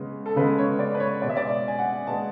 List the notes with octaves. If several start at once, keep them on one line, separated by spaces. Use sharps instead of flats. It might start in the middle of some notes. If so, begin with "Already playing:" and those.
Already playing: C#3 G#3 B3
A4
C#3 G#3 B3 B4
C#5
D5
B4
C#5
B2 G#3 B3 D5
E5
D5
E5
G#5
F#5
B2 G#3 B3 A5